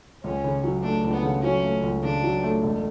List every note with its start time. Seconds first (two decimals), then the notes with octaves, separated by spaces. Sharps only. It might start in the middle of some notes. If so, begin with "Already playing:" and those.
0.23 C#2 C#4
0.44 C#3
0.64 F#3
0.83 A3 D4
1.04 C#2
1.13 B3
1.23 C#3
1.43 F#3 C#4
1.63 A3
1.83 C#2
2.03 C#3 D4
2.23 F#3
2.43 A3
2.63 E1